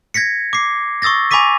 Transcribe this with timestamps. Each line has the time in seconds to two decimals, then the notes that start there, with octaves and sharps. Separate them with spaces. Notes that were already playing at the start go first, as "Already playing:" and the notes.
0.14 G#6 A#6 B6 C#7
0.53 D6 C7
1.02 C#6 D#6 E6 A6 A#6
1.31 G#5 B5 C#6 D6 B6 D#7